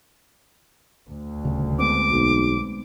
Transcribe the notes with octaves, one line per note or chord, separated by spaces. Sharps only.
D2
D#1 C#3
G#3 B3 C4 D6
B1